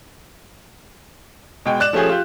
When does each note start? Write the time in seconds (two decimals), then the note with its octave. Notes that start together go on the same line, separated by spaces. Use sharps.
1.66 B2 G#3 G5
1.80 D5 F#6 E7
1.93 F3 A3 C#4 G4 G#4
2.09 F4 G4